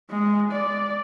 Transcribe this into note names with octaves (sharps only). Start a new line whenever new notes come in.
G#3
D5